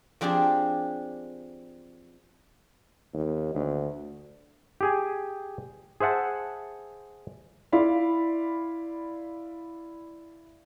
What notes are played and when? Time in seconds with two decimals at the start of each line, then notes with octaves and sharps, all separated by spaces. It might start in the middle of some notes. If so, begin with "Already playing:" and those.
0.21 F3 C4 D4 G4 G#4
3.13 D#2
3.54 D2
4.81 G4 G#4 G#5
6.00 G#4 C5 E5 F#5 A5
7.72 E4 D5 F5 B5 C6